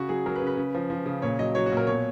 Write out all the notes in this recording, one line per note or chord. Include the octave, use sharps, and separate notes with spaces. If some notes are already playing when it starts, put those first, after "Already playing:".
Already playing: C#3 F#4
F#3 G#4
F#3 A#4
B4
C#3
B4
C#3
F3
F3
C#3
A#2 C#5
F#3 D#5
F#3 C#5
F#4
A#2
A#4
B2 C#5